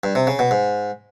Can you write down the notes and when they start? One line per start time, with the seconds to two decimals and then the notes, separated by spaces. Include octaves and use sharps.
0.03 G2
0.15 C3
0.27 C#3
0.39 B2
0.51 G#2